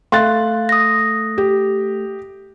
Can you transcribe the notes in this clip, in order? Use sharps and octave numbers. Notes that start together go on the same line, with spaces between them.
A3 F5 C6 F#6 A6
D#6 A#6
G4